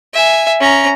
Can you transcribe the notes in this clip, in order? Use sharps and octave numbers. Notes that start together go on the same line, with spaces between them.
E5 G#5
C#4 A#5